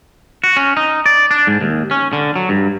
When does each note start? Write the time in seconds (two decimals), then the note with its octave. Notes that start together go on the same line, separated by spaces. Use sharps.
0.44 F#4
0.57 C#4
0.77 D#4
1.06 D5
1.31 D4
1.47 G#2
1.61 D#2
1.91 C#4
2.13 D3
2.36 F#3
2.49 G2